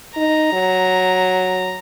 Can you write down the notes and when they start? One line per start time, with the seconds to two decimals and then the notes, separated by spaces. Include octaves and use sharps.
0.17 D#4 A#5
0.52 F#3